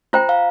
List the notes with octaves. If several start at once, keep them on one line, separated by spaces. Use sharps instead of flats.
F4 C5 G5 A#5
F5